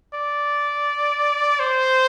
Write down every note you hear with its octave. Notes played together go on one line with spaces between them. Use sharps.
D5
C5